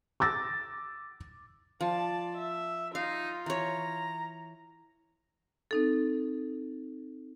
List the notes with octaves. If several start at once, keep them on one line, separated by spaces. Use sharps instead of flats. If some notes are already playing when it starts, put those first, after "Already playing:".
D6 E6 A6 A#6
F3 D5 A5
E5
D#4 F4 F5
E3 C#5 A#5
C4 D#4 A4